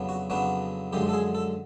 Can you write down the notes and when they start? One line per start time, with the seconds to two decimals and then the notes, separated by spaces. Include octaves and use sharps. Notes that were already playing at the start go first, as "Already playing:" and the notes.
Already playing: F2 C#3 F#3 B3 D4
0.09 F#4
0.30 F2 C#3 F#3 B3 D4 F#4
0.93 F#2 D3 F3 G#3 G4
1.09 A4
1.14 G#4
1.35 A4